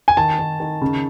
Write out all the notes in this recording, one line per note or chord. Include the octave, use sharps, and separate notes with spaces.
G#5
D#3 A5
D#3
D#3
C#3